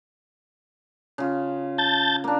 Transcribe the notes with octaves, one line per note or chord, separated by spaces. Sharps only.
C#3 F4
A5 G6 A6
A#3 D4